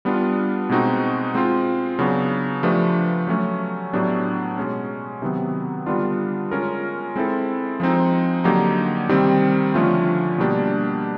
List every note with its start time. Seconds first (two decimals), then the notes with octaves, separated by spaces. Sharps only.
0.05 G3 B3 D4 F4
0.69 B2 G#3 C4 D#4 F#4
1.35 G#3 C4 F4
1.99 C#3 F#3 B3 D4
2.63 F3 A3 D4 G4 B4
3.27 F#3 A3 C#4
3.93 A2 F#3 B3 D4 G4
4.58 B2 G#3 C#4
5.22 C3 D#3 F#3 B3
5.86 D3 G3 B3 D4 F4
6.51 G#3 C#4 F4 A#4
7.16 G#3 C4 E4 A4
7.80 F3 G#3 C4 D#4
8.44 D3 F#3 A#3 D#4 G4
9.09 C3 D#3 G3 C4
9.74 D3 F3 A3 C#4 F4
10.38 B2 G3 A#3 D4 G4